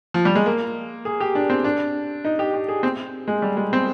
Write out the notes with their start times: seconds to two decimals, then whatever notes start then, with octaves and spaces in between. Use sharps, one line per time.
0.14 F3
0.25 G3
0.35 G#3
0.46 A#3
1.05 G#4
1.20 G4
1.35 D4
1.50 C4
1.64 D4
2.25 D#4
2.39 G4
2.54 G4
2.68 G#4
2.83 C4
3.28 G#3
3.42 G3
3.57 G#3
3.73 C4